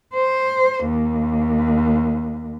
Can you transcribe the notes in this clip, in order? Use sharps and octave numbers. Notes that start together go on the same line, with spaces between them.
C5
D#2